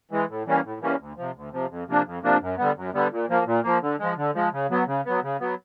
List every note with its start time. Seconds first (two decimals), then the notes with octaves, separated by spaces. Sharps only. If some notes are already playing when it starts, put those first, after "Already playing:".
0.11 E3 G#3
0.29 A2
0.46 E3 G3 A#3 C#4
0.64 A2
0.81 E3 G3 A#3 C#4
0.99 D2
1.17 C3 F3
1.35 D2
1.52 C3 F3
1.70 F2
1.88 C3 F3 A#3 D4
2.05 F2
2.23 C3 F3 A#3 D4
2.41 F#2
2.58 D3 G3 B3
2.76 F#2
2.94 D3 G3 B3
3.12 A#2
3.29 F3 A#3
3.46 A#2
3.64 F3 A#3
3.82 D3
3.99 F3 G#3
4.17 D3
4.34 F3 G#3
4.53 C#3
4.70 F#3 B3
4.87 C#3
5.06 F#3 B3
5.23 C#3
5.40 F#3 B3